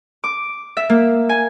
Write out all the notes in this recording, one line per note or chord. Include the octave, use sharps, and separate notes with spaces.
D6
E5
A#3
G#5